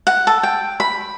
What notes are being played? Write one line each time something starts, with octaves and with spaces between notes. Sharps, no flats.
F#5
A4
G5
B5